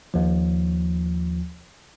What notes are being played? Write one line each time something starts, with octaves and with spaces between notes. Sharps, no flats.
D#2 F3